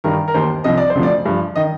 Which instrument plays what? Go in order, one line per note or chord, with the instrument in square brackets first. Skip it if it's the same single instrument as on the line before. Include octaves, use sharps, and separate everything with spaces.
[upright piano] G2 D#3 A#4
A#4
D#2 D#3 C5
C2 C3 F3 D#5
D5
C5
D2 C3 F3
D5
G2 F3
D#3 D#5